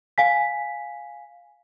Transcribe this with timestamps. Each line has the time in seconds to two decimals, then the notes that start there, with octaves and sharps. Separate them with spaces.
0.18 F5 G#5 B6